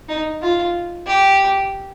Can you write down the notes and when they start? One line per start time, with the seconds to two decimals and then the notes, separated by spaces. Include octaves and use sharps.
0.08 D#4
0.42 F4
1.07 G4